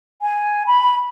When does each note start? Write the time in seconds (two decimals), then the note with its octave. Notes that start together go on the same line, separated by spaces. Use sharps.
0.22 G#5
0.67 B5